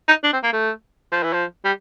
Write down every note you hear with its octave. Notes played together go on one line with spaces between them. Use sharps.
D#4
D4
C4
A#3
A3
F3
E3
F3
G3